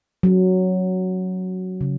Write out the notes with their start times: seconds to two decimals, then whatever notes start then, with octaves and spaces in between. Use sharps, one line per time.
0.23 F#3
1.81 C#3